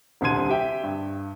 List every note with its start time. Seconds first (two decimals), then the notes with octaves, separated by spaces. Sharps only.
0.21 D#1 C2 D3 C6 G#6 D#7
0.49 G4 E5 G5
0.83 G2